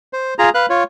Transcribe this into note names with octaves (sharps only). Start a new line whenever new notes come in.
C5
F4 G#4 A#5
B4 F5 F#6
F4 C#5